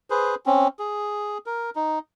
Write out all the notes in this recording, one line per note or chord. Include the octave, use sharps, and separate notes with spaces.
G#4 B4 C5
C4 C#4
G#4
A#4
D#4